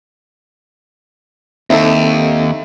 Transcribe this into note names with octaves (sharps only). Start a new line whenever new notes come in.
D#2 C4 D#4 A4 E5